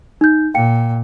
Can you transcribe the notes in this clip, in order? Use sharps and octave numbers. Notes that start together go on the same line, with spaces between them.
D#4 G6
A#2 F5 G5 C#7